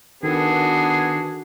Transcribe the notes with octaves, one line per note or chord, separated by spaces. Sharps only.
D#3 B3 D4 F#4 G#4 A4